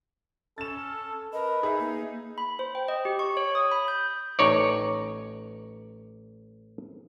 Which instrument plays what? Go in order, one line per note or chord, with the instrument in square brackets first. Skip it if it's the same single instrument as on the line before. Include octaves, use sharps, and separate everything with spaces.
[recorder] C#4 [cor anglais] A4 [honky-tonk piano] A6 E7
[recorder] A#4 [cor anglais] B4 [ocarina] D#5
[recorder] D#4 [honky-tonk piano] G#4 E5
[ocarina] A#3
[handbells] B5
C5
G5
D#5
G4
C#6
C#5
D#6
B5
G6
[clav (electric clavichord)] A1 D#4 C#5 D5